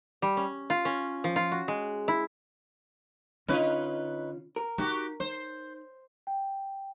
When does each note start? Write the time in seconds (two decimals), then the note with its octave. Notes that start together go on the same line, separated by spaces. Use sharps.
0.22 G3
0.37 C#4
0.70 F4
0.85 C#4
1.24 F3
1.36 F4
1.52 F#4
1.68 G#3
2.08 E4
3.48 D3 C#4 D#4 F4 B4 C#5
4.56 A#4
4.78 D#4 F#4 G4
5.20 D#4 C5
6.27 G5